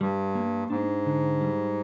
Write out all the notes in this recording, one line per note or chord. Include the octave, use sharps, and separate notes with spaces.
G2 G3
A#3
G#2 D4
D3
G3